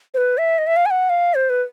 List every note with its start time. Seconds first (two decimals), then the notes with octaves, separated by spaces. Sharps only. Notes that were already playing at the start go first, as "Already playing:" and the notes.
0.14 C5
0.17 B4
0.38 E5
0.58 D#5
0.67 E5
0.76 F5
0.86 G#5
0.91 F#5
1.10 F5
1.35 C5
1.50 B4